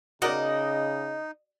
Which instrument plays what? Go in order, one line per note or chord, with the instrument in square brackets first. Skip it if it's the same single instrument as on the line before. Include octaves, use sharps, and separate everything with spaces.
[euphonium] C#3 [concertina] D#4 [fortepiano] F#4 A#4 D5 [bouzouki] D#5